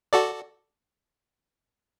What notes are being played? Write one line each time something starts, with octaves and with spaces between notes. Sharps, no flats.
F#4 A4 D5